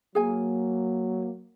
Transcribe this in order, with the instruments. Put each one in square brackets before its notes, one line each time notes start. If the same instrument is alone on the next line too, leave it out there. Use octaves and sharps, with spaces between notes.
[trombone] F#3 [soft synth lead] A#3 [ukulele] G#4 G#5